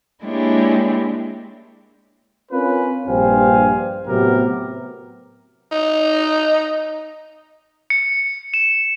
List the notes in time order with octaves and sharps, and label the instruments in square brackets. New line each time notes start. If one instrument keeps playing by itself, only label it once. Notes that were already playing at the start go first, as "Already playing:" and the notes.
[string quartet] G#3 A#3 D4 E4 G4 C#5
[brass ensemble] C4 C#4 F4 A#4 B4
A#1 G2 G4 C5 F5 G#5
A2 C3 F#3 B3 G4 A#4
[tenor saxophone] D#4
[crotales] C#7
E7